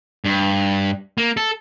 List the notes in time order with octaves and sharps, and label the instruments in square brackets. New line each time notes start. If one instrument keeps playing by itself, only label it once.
[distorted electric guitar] G2
A#3
A4